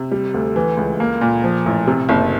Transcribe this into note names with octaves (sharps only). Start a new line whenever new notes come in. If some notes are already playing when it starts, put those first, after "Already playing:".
Already playing: C3
G3
D2
E3
C#2
A#3
A#2
F3
A1
C3
F#1